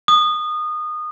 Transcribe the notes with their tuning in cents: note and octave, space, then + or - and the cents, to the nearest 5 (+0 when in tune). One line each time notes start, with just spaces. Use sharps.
D#6 -25